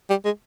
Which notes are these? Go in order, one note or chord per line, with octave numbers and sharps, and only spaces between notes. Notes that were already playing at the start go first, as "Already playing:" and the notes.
G3
G#3